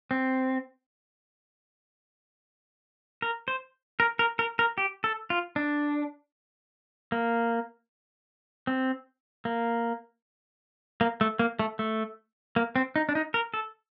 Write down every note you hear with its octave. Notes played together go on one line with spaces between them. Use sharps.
C4
A#4
C5
A#4
A#4
A#4
A#4
G4
A4
F4
D4
A#3
C4
A#3
A#3
A3
A#3
A3
A3
A#3
C4
D#4
D4
D#4
A#4
A4